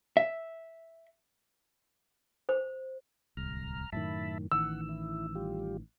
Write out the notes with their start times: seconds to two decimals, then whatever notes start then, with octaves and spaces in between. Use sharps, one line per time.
0.17 E5
2.49 C5
3.37 D1 C2 A#5 F6
3.92 F#2 A2 D#3 E5 A5 B5
4.52 A1 D#3 E3 F#5 E6
4.89 E4
5.35 G3 F4 G4